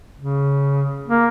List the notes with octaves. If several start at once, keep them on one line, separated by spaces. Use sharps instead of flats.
C#3
A#3